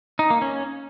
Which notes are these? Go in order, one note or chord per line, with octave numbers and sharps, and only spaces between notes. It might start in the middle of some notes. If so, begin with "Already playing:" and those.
D#4
A#3
C#4